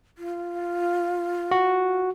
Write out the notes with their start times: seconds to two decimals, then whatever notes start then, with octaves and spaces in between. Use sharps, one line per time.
0.18 F4
1.51 F#4